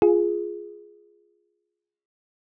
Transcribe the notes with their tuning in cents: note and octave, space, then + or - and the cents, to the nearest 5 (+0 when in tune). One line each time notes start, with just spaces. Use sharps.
F4 -5 G#4 +0